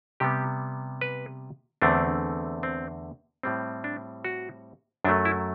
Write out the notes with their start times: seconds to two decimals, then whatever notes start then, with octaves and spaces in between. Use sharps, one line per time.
0.20 C3 G3 B3 G4
1.01 B4
1.82 E2 D3 A3 C4 D4
2.63 C4
3.43 A2 G3 C4
3.84 D4
4.25 F#4
5.05 F#2 F#3 A3 D4
5.25 E4